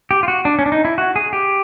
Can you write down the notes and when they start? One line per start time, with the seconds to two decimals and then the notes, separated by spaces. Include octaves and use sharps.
0.11 G4
0.23 F4
0.28 F#4
0.45 D4
0.59 C#4
0.66 D4
0.72 D#4
0.85 E4
0.98 F#4
1.16 G#4
1.33 G4